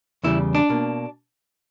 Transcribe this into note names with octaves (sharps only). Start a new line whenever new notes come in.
E2 C#3 G3 E4
D4
B2 A#3